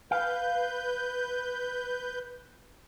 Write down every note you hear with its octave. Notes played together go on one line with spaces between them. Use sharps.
B4 F5 G6